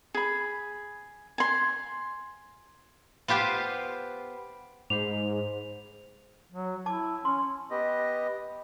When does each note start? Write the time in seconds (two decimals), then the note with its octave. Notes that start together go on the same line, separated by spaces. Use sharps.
0.15 G#4 B5
1.38 G#5 C6
3.28 B3 F4 G4 B4 C5
4.90 G#2 C5 B5 D6 F7
6.52 F#3
6.86 E4 A5 D6
7.25 C#4 C6
7.71 B3 G4 D#5